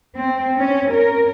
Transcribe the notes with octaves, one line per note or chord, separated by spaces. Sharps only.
C4
C#4
A#4